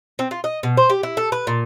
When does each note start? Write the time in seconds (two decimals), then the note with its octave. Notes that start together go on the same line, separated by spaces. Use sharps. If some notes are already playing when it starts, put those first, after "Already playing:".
0.19 C4
0.31 F4
0.44 D#5
0.63 B2
0.77 C5
0.90 G4
1.03 E4
1.17 A4
1.32 B4
1.47 A#2